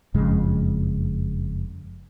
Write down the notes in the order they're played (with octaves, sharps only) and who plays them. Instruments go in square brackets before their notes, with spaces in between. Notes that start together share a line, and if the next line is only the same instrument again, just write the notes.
[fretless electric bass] F#1 F2 C#3 G#3